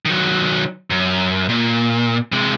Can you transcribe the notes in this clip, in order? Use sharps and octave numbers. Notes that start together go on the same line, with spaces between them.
D#3 F#3
F#2
A#2
C3 G#3